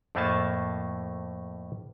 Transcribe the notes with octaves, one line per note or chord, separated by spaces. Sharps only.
F2 A2 A3 A#3 G#5 A5